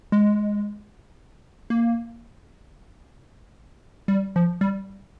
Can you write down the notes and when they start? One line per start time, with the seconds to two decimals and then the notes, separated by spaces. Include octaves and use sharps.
0.12 G#3
1.70 A#3
4.08 G3
4.36 F3
4.61 G3